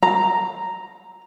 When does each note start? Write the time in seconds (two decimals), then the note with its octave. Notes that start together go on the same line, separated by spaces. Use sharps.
0.03 A#5